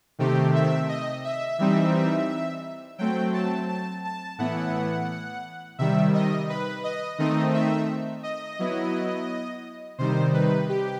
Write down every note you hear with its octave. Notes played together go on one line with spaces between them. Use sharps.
C3 D#3 A3 C4 G4
E5
D#5
E5
E3 G3 C4 D#4
F#3 A3 C4 G5
A5
A5
A5
A2 E3 B3 E4 F#5
C3 D#3 G3 E5
D#5
B4
D#5
D#3 A3 C4 D#4 D#5
E5
D#5
F#3 B3 E4
C3 D#3 G3 D#4 C5
B4
G4